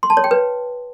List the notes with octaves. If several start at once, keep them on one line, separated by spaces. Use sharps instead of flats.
C6
A5
C#5
G5
B4